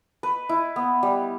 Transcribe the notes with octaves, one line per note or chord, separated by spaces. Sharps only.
B4
E4
B3
G3